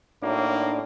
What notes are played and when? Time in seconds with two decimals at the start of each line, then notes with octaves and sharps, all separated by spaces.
0.22 A2 F#3 A#3 D4 D#4 D5